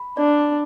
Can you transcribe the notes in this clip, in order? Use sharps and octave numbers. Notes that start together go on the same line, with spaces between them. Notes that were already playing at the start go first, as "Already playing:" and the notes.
Already playing: B5
D4 D5